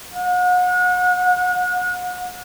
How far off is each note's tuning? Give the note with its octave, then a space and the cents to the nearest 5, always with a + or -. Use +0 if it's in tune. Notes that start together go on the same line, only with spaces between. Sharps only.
F#5 -35